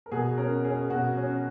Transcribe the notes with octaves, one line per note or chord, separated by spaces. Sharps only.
A#4
B2 G#4
C#4 A#4
C#4 G#4
B2 F#4
C#4